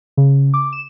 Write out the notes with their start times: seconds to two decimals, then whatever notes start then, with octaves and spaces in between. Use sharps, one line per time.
0.17 C#3
0.54 D6
0.73 E7